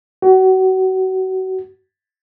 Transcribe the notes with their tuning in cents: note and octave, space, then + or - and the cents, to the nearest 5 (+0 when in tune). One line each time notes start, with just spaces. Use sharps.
F#4 +30